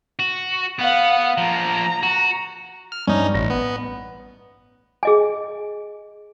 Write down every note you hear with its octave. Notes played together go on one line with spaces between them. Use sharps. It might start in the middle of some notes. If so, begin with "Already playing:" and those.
F#4
B3 F5 F#5
F3 A#3 A#5
F#4
F6
G2 C#4 D#4
A1 A#6
B3
G#4 D#5 G#5